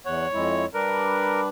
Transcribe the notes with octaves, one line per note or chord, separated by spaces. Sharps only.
E2 C#5 F#5
F2 G#3 E4
G3 D4 A#4 B4